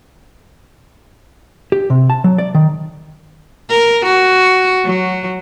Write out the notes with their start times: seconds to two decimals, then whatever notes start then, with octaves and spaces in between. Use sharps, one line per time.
1.72 G4
1.90 C3
2.10 A5
2.24 F#3
2.38 D5
2.55 D#3
3.70 A#4
4.06 F#4
4.85 F#3